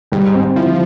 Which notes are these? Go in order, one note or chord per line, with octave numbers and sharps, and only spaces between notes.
G#2 G3
C4
F3 E4